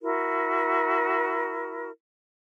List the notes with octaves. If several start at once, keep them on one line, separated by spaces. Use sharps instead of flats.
E4 F#4 A#4